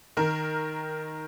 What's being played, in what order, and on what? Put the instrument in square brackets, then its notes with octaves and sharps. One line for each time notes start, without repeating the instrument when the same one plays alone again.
[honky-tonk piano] D#3 A#4